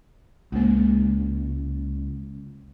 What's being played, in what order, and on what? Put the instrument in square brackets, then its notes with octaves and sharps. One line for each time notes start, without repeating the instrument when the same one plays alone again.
[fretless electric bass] C#2 [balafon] G#3 A#3